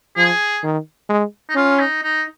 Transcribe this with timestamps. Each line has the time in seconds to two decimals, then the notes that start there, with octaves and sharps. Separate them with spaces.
0.17 F3 G#4
0.64 D#3
1.10 G#3
1.49 D#4
1.55 C#4 F4
1.79 D#4
2.02 D#4